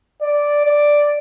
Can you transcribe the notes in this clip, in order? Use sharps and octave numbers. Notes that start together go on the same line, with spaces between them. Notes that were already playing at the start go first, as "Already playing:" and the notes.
D5
D5